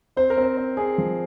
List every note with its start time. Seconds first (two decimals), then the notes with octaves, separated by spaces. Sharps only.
0.17 C4 C5
0.30 A#4
0.37 C4 C5
0.57 C4
0.77 C4 G#4
0.98 F3